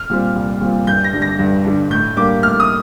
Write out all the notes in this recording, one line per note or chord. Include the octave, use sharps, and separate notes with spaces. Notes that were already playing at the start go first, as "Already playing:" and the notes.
Already playing: F6
A#2 G3 C4
C2
A#2 G3 C4
G2 G6
A#6
D3 G3 D4
A#6
G2
D3 G3 D4
A2 G6
G3 A#3 D4 G4 D6
A2 F6
D#6